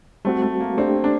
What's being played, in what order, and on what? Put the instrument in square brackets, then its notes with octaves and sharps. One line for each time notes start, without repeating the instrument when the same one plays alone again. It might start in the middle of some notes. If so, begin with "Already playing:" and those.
[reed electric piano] G3 C4 F#4 [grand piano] A3
[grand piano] A3
A#3
[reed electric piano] A3 D4 G4 [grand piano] C4
[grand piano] D4